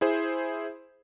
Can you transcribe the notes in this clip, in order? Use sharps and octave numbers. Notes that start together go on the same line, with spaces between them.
E4 G#4 C5